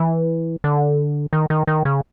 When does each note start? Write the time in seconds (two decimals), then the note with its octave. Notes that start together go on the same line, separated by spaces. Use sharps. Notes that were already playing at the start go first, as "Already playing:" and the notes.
Already playing: E3
0.64 D3
1.33 D#3
1.50 D#3
1.67 D#3
1.85 C#3